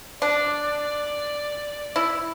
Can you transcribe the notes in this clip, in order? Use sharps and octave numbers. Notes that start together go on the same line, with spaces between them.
D4 D5
E4